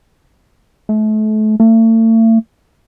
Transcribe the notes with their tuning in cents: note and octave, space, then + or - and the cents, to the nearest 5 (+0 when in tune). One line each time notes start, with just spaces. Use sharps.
A3 -35
A3 +40